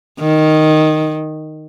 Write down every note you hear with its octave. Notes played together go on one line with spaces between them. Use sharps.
D#3